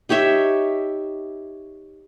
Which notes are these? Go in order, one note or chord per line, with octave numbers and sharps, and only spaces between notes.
D#4 G4 C#5 E5